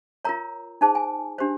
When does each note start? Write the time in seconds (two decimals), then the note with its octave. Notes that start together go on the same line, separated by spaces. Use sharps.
0.25 F4 A#4 C#5 A#5
0.81 D#4 G#4 C5 A5
0.95 G#5
1.38 D4 G4 C5